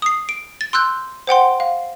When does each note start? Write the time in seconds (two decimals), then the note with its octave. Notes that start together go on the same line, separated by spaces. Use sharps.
0.02 D#6 C7
0.29 D7
0.61 A6
0.73 C6 E6 F#6 G6
1.27 C5 F#5 G5 C6
1.60 F5